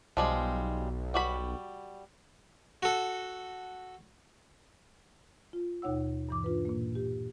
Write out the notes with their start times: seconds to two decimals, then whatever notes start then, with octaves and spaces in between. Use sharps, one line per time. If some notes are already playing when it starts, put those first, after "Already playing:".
0.17 B1 F3 G3 G#3
1.14 G3 F#4 B5
2.83 F#4 A4
5.53 F4
5.82 D#2 B2 D#4 C#5 F#5 E6
6.29 G2 E3 D6
6.44 D4 F4 B4
6.65 A#2 A#3
6.95 G4